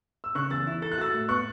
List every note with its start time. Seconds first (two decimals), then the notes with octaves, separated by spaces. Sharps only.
0.24 E6
0.35 C#3 C#6 F#6
0.50 E2 E6 A6
0.67 E4
0.82 A4 A6
0.92 F#6
0.98 F#4 E6 A6
1.14 A2
1.29 B3 C#6 F#6